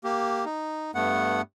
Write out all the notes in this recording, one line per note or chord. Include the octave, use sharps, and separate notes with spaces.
A#3 G4
D#4
G2 A3 B3 F#5